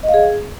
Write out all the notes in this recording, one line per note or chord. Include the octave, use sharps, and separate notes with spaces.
D#5
F5
G#4